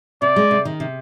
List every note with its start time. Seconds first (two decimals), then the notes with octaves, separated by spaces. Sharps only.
0.22 C3 D5
0.36 G#3
0.51 C3
0.65 D#3
0.80 C3